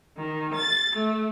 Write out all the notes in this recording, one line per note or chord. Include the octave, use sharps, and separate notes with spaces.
D#3
A6
A3